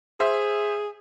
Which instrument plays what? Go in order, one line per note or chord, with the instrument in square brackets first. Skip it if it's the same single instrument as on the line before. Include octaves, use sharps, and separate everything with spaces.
[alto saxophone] G#4 [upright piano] C5 E5